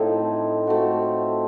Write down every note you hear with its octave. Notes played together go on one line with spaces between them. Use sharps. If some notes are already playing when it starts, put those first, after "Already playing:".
Already playing: A2 F3 C4 D#4
F3 A3 C4 F#4